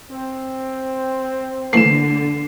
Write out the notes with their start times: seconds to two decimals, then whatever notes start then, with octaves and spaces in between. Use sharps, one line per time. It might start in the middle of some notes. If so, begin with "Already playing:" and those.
0.10 C4
1.73 D3 E3 A3 A#3 C7 E7